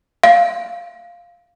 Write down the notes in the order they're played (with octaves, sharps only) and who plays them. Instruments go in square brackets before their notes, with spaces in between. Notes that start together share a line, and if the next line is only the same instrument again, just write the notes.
[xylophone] F5